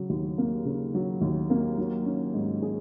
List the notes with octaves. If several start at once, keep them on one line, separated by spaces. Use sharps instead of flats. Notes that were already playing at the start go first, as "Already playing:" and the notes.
Already playing: C#3 F#3
D#2
A#3
C#3
F#3
D#2
A#3
F#3
C#4
G#2
G#4